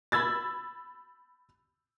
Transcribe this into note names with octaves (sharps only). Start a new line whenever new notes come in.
B5 E6 G#6 A6